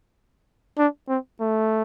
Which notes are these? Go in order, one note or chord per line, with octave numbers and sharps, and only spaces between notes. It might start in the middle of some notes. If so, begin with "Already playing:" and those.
D4
C4
A3